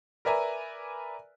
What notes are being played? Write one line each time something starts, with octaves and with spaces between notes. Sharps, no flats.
A#4 B4 D5 E5 G#5 A#5